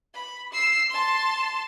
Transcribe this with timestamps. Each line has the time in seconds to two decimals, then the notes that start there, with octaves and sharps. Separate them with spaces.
0.14 B5
0.53 E6 C7
0.90 A5 C6